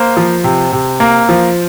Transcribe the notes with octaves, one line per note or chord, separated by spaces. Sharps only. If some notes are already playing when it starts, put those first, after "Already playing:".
Already playing: A#3 C5
F3
C3
C3
A#3
F3